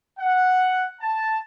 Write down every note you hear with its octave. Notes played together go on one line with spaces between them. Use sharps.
F#5
A5